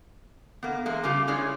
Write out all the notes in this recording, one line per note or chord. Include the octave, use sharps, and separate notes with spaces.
A#3 B3
E2 G#3 A#3
C#3 G3 F4 G4 F5
G#3 C#4 E4 G#4 C#5 D5